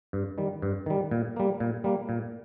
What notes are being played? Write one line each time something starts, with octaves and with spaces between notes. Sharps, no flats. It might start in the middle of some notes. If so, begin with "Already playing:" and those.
G2
D#3 G3
G2
D#3 G3
A#2
G3 A#3
A#2
G3 A#3
A#2